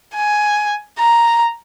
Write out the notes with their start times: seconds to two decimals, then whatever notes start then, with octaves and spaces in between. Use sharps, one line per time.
0.15 G#5
0.99 A#5